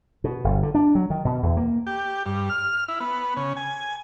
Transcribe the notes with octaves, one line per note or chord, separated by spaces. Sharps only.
B2
G1
D3
D4
F#3
D#3
B2
E2
A#3
G4
G2
F6
E4
B3
C#3
G#5